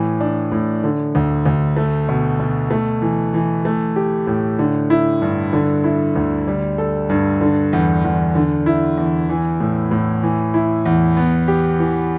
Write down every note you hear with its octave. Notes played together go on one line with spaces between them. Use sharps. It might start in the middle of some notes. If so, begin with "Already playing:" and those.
Already playing: A2 E3
D4
A2
D3
D2
D2
A3
B2
B2
A3
E3
E3
A3
G4
A2
D3
E4
G2
D3
E4
D2
G3
A4
G2
D3
E2
E2
D3
E4
E2
E3
A2
A2
E3
E4
E2
B3
G4
E3